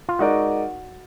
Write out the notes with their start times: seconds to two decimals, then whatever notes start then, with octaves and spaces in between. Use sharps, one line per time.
0.09 F4
0.19 G#3 D#4 F#4 A#4 D5